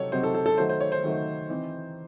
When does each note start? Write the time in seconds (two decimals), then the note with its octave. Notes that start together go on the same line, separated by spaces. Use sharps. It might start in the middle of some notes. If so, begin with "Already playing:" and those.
Already playing: C3 F#3 C4 D#4 A4 C#5
0.12 C3 F#3 C4 D#4 C5
0.23 A4
0.35 A4
0.46 A4
0.58 D#3 F#3 A3 D#4 C5
0.69 C5
0.81 C#5
0.92 C5
1.04 D#3 F#3 A3 D#4
1.50 E3 C4 D#4